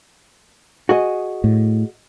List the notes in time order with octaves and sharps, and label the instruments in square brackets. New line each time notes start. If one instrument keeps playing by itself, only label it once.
[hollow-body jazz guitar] F#4 G#4 D#5
[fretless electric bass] A2